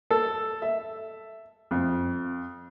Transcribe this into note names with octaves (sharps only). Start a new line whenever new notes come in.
A4
E5
F2